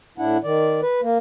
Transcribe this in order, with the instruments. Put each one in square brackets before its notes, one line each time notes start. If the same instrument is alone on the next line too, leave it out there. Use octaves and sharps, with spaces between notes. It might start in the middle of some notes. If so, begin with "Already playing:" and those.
[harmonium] A2 D4 E4 F#5
D#3 D5
B4
A#3